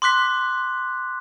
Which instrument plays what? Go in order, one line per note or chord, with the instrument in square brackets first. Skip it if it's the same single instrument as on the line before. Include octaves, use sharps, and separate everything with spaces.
[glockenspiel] C6 D6 F#6 B6